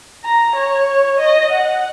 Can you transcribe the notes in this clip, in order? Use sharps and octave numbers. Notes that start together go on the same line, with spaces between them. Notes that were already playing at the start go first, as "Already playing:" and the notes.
A#5
C#5
D#5
F#5